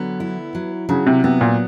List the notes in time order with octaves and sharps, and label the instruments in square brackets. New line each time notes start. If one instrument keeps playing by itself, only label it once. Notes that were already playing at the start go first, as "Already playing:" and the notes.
Already playing: [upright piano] D3 [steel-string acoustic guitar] F#3 B3
[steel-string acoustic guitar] E4
F#3
[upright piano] C#3 [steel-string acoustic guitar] F#3
[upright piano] C3
[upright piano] C3 [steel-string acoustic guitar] B3
[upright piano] A#2